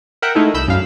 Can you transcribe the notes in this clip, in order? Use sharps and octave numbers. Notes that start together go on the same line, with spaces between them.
A#4 E5 F#5 G5
G#3 A3 D#4 E4 A4
C2 B5 E6 G6
F#2 F5